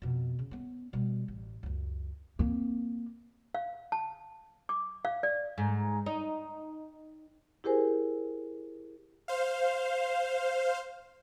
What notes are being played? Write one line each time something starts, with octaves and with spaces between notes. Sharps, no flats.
F2 B2
C#3
B3 C#4
B2 G3
A1
C#2 F#2
A#3 C4
F5
A5
D6
F5
D5
G#2
D#4
E4 G4 G#4 A#4 C5 G#5
C5 F5